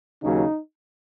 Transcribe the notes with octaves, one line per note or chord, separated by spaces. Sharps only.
D#2 C#3 F#3 D#4